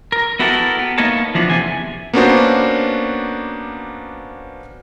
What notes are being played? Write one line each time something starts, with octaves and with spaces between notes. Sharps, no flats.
A#4
B3 E4 F#4 G4 A4 A#4
B3
A#3 B3 D#4 A#4 C#5 A5
E3 F3 B3 D4
E2 C3 A3 G#5
A#3 B3 C#4 D4 F#4 C5